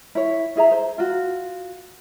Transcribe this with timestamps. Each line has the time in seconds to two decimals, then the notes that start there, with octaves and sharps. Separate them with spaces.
0.15 E4 C#5
0.56 E4 G#4 E5 A#5
0.71 C5
0.98 F4 F#4